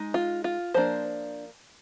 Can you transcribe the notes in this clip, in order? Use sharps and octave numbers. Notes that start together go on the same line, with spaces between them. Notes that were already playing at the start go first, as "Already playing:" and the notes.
Already playing: G#3 D#4
F4
F4
F3 A#3 D4 C5